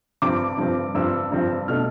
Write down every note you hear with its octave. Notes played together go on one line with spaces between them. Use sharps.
G2 F3 C4 D6
G2 F3 C4
G2 F3 C4 E6
G2 F3 C4
B2 A3 D4 F6